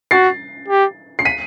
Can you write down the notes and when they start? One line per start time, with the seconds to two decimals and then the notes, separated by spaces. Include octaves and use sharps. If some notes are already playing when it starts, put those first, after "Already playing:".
0.11 F#4 A6 C7
0.68 G4
1.19 C7
1.25 B6 D#7